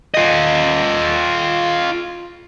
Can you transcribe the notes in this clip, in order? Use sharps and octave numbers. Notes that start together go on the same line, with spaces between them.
F4 D#5